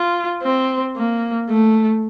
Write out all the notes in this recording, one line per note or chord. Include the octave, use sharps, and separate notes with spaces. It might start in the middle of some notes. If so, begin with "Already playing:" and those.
Already playing: F4
C4
A#3
A3